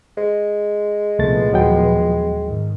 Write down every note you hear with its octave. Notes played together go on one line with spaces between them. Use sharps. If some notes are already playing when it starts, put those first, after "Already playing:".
G#3
C2 A#2 F3 A3 B3 A6
D#2 F#3 G5
G#2 D#3